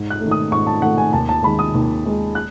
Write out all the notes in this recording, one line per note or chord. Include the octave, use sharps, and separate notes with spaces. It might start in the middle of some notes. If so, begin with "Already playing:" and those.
Already playing: G#2
F#6
D#3 A3
D#6
G#2 C#6
A5
D#3 A3 F#5
G#5
D#2 A5
A5
D#3 G#3 B5
D#6
D#2
D#3 G#3
F#6